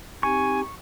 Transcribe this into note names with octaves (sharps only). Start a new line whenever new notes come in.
C4 D#4 G4 G#5 C#6